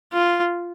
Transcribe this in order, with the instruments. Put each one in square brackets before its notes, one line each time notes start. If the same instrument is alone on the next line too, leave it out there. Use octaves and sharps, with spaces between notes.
[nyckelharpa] F4